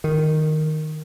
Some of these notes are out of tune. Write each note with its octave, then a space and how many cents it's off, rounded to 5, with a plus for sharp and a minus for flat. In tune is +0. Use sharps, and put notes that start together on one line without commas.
D#3 -5